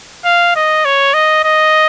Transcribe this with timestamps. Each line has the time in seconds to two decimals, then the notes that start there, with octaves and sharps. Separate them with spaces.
0.25 F5
0.56 D#5
0.85 C#5
1.14 D#5
1.44 D#5